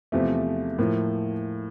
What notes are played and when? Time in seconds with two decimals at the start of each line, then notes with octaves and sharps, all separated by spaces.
0.12 E2 C3 F3 A3
0.79 A2 F3 A#3